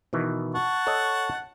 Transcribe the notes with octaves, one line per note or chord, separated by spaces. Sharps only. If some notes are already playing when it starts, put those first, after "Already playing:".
B2 D#3 E3
F#5 A5 C#6
A4 C#5 D#5